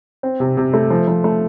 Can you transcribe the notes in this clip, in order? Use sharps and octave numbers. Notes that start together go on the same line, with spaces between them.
C4
C3
C3
A3
F3
F3
A3